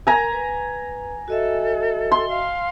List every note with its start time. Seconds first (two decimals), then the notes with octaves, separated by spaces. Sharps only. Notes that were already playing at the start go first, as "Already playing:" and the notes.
0.07 A#4 G#5 A#5
0.32 B4
1.28 F#4 A4 D#5 E5
2.12 C6
2.28 F5